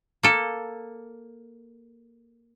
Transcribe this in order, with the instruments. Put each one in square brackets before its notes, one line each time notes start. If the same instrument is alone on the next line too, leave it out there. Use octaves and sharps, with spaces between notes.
[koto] A#3 A4